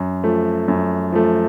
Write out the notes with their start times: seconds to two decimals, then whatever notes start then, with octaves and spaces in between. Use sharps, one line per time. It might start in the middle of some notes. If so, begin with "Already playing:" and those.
Already playing: F#2
0.24 F3 A3
0.68 F#2
1.12 F3 A3